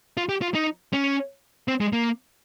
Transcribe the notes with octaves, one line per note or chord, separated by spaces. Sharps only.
F4
G4
F4
D#4
C#4
C4
G#3
A#3